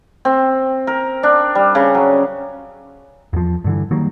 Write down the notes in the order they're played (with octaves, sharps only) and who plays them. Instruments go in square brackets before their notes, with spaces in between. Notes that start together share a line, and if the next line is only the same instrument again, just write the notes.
[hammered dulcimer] C4
A#4
D4
G3
C#3
F#3
[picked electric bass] E2 F3
G2 D3 E3
D#3 F#3 G3 A#3